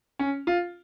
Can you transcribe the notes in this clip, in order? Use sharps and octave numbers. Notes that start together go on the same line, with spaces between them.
C#4
F4